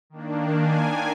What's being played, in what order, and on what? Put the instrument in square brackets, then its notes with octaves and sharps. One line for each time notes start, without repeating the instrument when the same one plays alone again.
[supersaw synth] D#3 A#3 D4
G#5